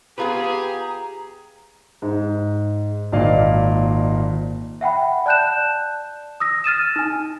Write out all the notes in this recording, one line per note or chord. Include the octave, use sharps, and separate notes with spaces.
B3 F4 G4 G#4 B4 A#5
G#2
G#1 A#2 D5 D#5 F5
E5 F#5 G5 B5
D5 A5 F#6 G6 E7
D#6 E6 A#6
F6 A6 D#7 E7
D#4 G#5